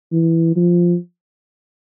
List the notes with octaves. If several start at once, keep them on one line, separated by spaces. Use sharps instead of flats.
E3
F3